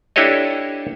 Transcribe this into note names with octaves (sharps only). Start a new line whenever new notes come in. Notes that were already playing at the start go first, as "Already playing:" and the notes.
D4 E4 G4 A4 C#5 D#5